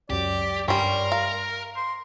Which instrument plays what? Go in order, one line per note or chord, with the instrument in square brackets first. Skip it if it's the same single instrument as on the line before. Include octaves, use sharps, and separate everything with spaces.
[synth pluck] C#2 F#2 [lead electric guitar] G4 [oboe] D5
[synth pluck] G2 [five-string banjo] G3 C#4 [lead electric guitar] A#4 [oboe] C6
[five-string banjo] F5 [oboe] A#5
[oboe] C6